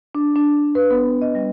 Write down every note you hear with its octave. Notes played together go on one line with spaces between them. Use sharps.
D4
D4
B4
B3
D#5
G3